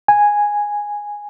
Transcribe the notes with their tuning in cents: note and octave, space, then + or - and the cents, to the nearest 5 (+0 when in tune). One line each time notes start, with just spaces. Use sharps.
G#5 -5